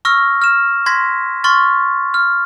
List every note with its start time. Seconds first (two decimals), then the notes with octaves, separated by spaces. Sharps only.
0.05 C#6 E6 F6 A#6
0.42 F6 E7
0.86 C6 G#6 A#6 B6
1.44 C6 C#6 F6 A6
2.14 F6